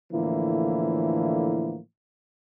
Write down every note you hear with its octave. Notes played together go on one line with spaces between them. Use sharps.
A2 D3 E3 F3 A#3 E4